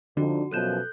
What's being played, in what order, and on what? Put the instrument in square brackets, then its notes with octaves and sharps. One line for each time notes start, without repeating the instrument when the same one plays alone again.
[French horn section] F2 D4 D#4 [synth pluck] D3 [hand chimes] F#4
[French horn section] F#2 B2 F3 [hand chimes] A4 F#6 G6 [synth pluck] D#7 E7